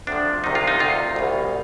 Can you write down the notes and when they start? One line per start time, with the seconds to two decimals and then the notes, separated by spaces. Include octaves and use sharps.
0.07 D2 C3 F3 D4
0.44 C2 C3 D#3 D#4
0.55 F4
0.68 D#4
0.79 D2 C3 D#3 F4
1.16 C2 B2